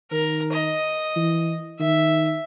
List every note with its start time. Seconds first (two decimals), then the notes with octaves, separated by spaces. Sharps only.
0.12 D#3 A#4
0.53 D#5
1.16 E3
1.80 D#3 E5